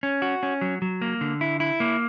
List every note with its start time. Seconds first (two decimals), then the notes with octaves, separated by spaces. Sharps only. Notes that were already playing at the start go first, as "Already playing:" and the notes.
0.03 C#4
0.22 F#4
0.43 C#4
0.61 F#3
0.82 F#3
1.02 A#3
1.21 D3
1.41 E4
1.60 E4
1.80 A#3